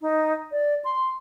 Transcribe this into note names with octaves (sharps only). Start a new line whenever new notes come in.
D#4
D5
C6